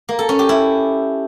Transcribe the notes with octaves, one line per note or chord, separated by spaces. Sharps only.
A#3
A4
C#4
G4
E4